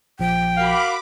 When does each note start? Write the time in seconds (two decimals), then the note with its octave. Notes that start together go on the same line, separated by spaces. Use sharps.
0.19 A#1 F3 G5
0.57 F#4 A#4 F5 B5 D6